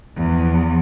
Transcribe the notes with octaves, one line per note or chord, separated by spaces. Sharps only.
E2 F3